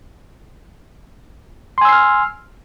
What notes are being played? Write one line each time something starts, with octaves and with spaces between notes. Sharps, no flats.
G#5 C6 E6 F6 C7